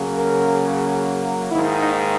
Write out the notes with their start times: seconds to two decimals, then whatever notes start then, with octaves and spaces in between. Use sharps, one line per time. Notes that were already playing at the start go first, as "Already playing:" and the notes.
Already playing: C#3 F#3 A#3
0.17 A#4
1.51 G#2 D#3 A#3 E4
1.80 D#4